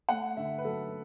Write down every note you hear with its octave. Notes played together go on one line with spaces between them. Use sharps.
A3 F#5
D3 E5
B4
F#3 A4